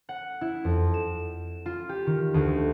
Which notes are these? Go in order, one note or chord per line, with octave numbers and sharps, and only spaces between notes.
F#5
E4
F2
E7
F4
G4
D#3
D2